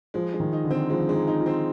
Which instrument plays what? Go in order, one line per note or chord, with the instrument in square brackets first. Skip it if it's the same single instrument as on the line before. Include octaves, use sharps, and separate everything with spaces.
[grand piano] F3 [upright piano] G#3
[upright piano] G#3
[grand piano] D#3
[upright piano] D#4
[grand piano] D3
[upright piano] C4
[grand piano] F3 [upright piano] G#3
[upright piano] G#3
[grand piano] D#4
[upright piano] D#4
[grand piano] F4
[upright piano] C4